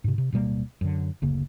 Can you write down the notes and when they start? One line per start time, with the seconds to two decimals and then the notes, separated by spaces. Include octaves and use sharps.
0.04 G#2 C3
0.18 C3
0.32 D1 B2 G3 A#3
0.81 F#2 D3
1.22 F#1 D2 C#3 A#3